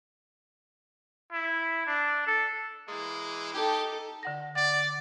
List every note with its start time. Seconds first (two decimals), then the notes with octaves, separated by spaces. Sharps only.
1.33 E4
1.87 D4
2.27 A4
2.88 E3 G#3 A#3
3.54 D#4 G4 A4
4.23 D3 F#5 A#6
4.56 D5 F#5